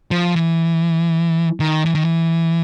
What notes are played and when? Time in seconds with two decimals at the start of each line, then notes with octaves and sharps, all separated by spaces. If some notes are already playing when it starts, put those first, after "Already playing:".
0.11 F3
0.36 E3
1.60 D#3
1.85 E3
1.95 D#3
2.05 E3